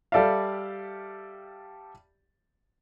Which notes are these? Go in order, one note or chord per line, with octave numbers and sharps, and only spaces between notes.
G3 G4 A4 D5 E5 F5